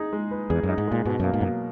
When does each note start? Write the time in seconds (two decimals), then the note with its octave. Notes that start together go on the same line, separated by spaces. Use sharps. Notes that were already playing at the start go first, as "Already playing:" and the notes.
Already playing: D#4 G#4
0.13 G#3
0.31 B4
0.50 E2 G#4
0.63 F#2
0.69 D#4
0.78 G#2
0.88 A#2 G#3
1.05 G#2 B2
1.20 F#2 A#3
1.34 G#2
1.41 F#2 F#3